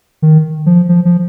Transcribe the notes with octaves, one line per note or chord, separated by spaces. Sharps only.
D#3
F3
F3
F3